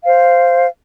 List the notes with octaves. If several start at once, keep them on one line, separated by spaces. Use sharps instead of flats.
C5 F5